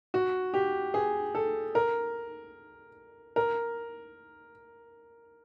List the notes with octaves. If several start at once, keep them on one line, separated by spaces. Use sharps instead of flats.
F#4
G4
G#4
A4
A#4
A#4